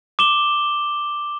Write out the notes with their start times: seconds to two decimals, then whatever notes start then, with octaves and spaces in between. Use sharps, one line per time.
0.19 D6 E7 G7